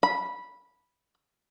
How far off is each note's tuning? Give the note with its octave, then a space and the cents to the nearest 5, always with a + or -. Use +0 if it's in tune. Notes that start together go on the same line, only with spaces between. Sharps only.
B5 -10